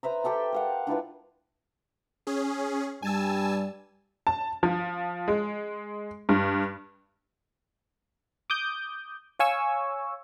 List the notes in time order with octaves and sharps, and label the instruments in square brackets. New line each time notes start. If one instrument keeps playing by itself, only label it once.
[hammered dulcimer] B4 C5 E5 A#5
G4 A4 G5 A5
A#4 F5 F#5
D4 E4 F4 B4
[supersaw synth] C#4 G#4
[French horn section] G2 G3 [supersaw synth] G#5 A5 E6
[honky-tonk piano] A5
F3
G#3
G2
[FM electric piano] D6 D#6 G6
C#5 F5 G#5 C#6 E6